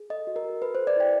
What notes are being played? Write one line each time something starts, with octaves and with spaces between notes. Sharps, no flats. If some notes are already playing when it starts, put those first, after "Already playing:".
Already playing: G#4
A4 D#5
F#4
A#4
F#4
A4 B4
C5
A4
D5
E4 G5